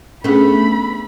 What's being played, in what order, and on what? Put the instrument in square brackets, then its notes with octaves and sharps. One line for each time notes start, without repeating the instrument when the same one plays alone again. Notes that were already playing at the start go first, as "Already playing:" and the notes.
[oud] A3 B3 [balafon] C#4 D4 G#4 [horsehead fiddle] B5